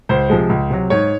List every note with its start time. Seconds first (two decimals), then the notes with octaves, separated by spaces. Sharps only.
0.09 C#2 C5
0.29 C3 F3 G#3
0.49 C#2
0.70 C3 F#3
0.90 G#2 C#5